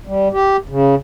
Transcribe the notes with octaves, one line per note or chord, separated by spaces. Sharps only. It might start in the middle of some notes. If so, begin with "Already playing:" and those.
G3
G4
C#3